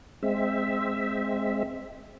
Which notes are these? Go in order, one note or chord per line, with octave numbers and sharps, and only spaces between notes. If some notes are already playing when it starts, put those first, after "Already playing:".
G#3 C4 E5